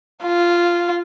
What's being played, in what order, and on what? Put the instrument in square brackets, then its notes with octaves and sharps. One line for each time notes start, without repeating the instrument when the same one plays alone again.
[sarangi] F4